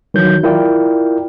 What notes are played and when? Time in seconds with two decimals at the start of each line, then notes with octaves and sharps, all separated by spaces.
0.14 D#3 E3 F#3 G6
0.43 E4 F4 A#4 D5 G5